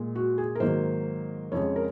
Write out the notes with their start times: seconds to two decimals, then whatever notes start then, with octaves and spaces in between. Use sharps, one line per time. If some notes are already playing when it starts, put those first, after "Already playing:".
Already playing: A#2 G#3
0.15 F#4
0.38 G#4
0.55 A#4
0.60 G#2 D#3 F#3 A#3 C5
1.52 F2 C#3 G#3 C#5
1.76 A#4